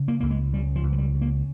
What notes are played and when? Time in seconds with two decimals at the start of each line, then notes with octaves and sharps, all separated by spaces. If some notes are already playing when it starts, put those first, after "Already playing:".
Already playing: C#3
0.08 A#3
0.20 C#2 A#3
0.30 G#3
0.53 C#3 G3
0.76 F3
0.83 C#2
0.93 F3
0.98 G3
1.15 C#3
1.21 A#3